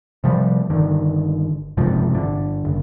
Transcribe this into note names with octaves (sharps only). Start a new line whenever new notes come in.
C3 F3 G3
G1 D3 D#3
F#1 G#2 C3 F3
G1 D3
F#1